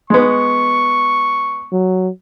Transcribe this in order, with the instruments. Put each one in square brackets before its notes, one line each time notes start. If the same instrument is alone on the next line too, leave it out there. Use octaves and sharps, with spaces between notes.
[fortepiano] G#3 B3 [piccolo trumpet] C#6
[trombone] F#3